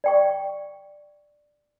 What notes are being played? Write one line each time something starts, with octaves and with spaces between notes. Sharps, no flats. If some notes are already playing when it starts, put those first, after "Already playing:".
D5 G5 C#6